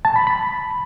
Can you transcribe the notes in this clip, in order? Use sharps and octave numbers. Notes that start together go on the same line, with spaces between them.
A5
B5
B5